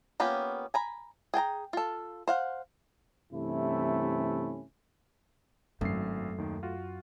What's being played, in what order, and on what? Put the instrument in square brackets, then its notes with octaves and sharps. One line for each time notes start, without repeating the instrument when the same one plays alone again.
[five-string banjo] A#3 B3 C#4 F4 G4
G#5 A#5 B5
G#4 G5 A5 A#5
F4 A4
C5 F5 F#5
[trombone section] G2 C3 E3 A3 C#4 E4
[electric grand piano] G#1 C7 [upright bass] F#2 [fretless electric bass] A3
[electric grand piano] D#2 D#3
F4 F#4